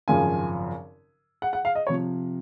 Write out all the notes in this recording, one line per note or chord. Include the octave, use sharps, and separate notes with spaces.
G#1 F#2 C#3 F3 G#5
F#5
F#5
F5
D#5
C#5
C3 F3